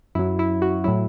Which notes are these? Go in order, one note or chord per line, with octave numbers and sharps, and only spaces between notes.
F#2 F#3 E4
E4
F#4
A2 F#3 E4